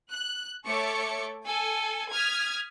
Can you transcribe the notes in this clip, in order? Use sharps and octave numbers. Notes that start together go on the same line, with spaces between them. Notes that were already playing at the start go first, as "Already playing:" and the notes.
F#6
A3 A4 C#5 C#6 D6 C#7
A4 G#5
D#6 F6 G#6 B6